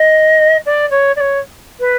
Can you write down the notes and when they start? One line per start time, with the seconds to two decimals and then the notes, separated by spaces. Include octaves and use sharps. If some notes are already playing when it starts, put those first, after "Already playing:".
Already playing: D#5
0.66 D5
0.90 C#5
1.16 D5
1.20 C#5
1.80 B4